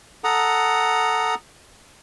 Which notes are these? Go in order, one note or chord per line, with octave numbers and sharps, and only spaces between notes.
A4 F#5 A#5 D#6